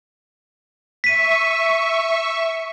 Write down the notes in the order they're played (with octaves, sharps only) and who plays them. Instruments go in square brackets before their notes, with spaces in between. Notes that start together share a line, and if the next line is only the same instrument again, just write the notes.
[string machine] E5 C#6 [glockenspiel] B6 D#7